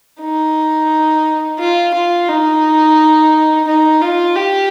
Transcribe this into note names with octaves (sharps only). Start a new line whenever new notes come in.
D#4
F4
F4
D#4
D#4
F4
G4